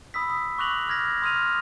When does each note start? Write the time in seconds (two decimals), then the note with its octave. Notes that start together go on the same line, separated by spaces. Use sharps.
0.14 B5 D#6 E6 B6
0.30 D#6
0.58 C#6 D6 F#6 A#6 F7 F#7
0.87 D6 F6 G#6 A#6
1.22 C6 D#6 F6 D#7 F7